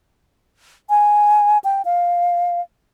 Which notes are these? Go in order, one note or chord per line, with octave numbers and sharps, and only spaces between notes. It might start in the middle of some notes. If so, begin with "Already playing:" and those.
G#5
G5
F5